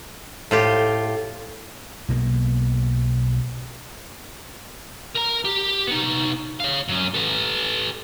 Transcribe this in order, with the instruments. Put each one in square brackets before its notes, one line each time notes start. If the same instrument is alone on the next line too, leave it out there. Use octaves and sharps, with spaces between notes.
[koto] A2 F4 G4 [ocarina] A4
[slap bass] B1 B2 E3 A#3
[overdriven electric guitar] A#4 A#5
G4
B3 D#4
C#5 F5
F#2 C#4
A4 B4